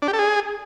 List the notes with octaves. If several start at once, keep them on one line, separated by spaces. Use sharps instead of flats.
D4
G4
A4
G#4